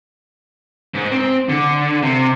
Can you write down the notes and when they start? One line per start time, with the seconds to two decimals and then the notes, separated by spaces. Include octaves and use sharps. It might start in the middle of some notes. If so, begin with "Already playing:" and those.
0.94 G#2
1.12 C4
1.49 D3
2.02 C3